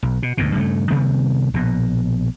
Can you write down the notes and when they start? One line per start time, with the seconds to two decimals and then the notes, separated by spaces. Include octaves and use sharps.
0.03 B1
0.23 B2
0.37 D2 G#2 B2
0.55 G2 C#3 G#3 A3
0.90 C3 D#3 G3 B3
1.54 A#1 B2